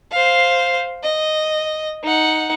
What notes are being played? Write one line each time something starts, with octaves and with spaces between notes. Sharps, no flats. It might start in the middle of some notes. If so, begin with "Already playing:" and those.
C5 F5
D#5
D#4 F#5